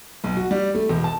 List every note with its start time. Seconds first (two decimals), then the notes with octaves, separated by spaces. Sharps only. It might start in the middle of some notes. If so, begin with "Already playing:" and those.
0.24 B1
0.37 F#4
0.51 G3
0.75 A3
0.89 E1
1.04 A5